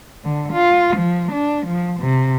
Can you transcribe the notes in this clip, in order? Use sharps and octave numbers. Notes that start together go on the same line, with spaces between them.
D3
F4
F3
D4
F3
C3